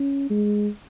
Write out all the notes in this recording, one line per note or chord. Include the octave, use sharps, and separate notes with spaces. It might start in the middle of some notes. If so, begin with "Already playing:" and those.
Already playing: C#4
G#3